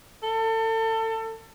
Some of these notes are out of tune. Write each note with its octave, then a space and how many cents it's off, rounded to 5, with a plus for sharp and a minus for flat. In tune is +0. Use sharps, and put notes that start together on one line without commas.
A4 +30